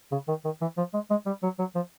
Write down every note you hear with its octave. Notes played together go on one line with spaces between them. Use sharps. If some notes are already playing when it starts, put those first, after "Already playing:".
C#3
D#3
D#3
E3
F3
G#3
G#3
G3
F#3
F#3
F3